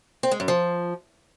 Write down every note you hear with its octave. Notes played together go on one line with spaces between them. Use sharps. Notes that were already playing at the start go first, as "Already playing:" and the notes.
C4
G#3
F#2
F3